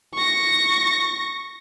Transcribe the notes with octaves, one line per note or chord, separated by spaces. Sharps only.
C#6 A#6